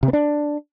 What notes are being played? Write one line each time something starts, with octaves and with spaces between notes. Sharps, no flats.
C3
B3
D4